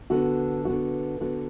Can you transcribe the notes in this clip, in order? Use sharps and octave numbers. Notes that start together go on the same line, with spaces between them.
D3 B3 F#4
D3 B3 F#4
D3 B3 F#4